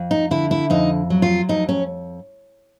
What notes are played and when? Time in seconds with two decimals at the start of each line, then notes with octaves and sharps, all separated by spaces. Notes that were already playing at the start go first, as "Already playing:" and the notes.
Already playing: F2
0.11 D#4
0.31 D3 E4
0.51 E4
0.70 F2 D#4
1.10 F#3
1.22 F4
1.49 F2 D#4
1.69 C#4